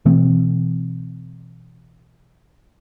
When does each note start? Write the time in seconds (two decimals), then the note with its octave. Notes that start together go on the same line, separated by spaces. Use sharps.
0.05 B2 E3 A3 C4